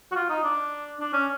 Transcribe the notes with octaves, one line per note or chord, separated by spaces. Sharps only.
F#4
F4
D#4
D4
D4
C#4